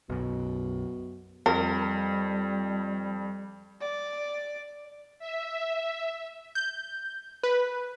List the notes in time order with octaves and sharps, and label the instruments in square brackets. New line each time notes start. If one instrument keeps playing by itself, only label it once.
[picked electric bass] B1 F#2 [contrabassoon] B2
[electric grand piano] F2 [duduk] G3 [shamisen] A#4
[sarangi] D5
[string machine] E5
[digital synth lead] G6
B4